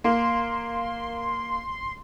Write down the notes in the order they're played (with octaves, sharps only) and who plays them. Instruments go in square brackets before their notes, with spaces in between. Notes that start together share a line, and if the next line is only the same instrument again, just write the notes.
[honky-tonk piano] A#3 [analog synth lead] C6